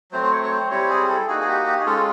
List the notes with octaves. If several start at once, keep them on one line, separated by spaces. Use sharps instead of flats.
F#3 A3 C4 C5
C5
C#5
C#5
C5
G3 C4 E4 C#5
G#4
A4
A#3 D#4 F#4 G#4
G#4
G4
G4
G#4
G#3 C#4 F4 A4